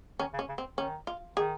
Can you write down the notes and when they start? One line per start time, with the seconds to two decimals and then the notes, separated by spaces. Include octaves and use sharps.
0.19 D#3 C#4
0.34 C#3
0.39 C#4
0.49 C#3
0.58 C4
0.78 D#3 C#4
1.07 F4
1.37 D#3 G#4